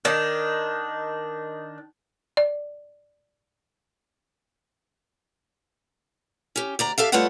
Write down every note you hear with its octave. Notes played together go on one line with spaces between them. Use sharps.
D#3 D4
D5
C#4 G4
D2 D5 A#5
G4 A4 E5 F5
G3 A3 F4 B4 C#5 F#5